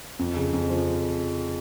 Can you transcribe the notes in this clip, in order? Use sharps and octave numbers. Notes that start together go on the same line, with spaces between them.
F2
C#3
F2
F3